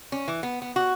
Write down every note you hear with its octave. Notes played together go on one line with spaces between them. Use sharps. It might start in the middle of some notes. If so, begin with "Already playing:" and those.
C#4
E3
B3
B3
F#4